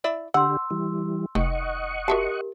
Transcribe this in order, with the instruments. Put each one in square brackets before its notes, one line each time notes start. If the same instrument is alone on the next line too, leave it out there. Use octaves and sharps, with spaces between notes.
[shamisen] E4 D5 E5
[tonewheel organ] D3 G4 [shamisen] F#5 [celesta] C6 E6
[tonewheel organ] E3 G3
[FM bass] F1 [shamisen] D#3 [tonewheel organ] D#5 F#5 C#6
[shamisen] F#4 E5 A5 [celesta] G4 A#4